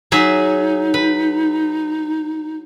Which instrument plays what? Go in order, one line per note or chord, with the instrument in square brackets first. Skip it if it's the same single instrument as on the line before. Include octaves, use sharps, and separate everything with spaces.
[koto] F#3 G#4 E5 [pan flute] D#4
[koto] B4